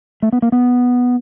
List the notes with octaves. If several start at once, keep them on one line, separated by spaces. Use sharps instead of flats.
A3
B3
A#3
B3